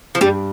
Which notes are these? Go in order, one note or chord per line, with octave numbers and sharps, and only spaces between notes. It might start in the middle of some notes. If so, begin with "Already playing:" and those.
F3
G2 G3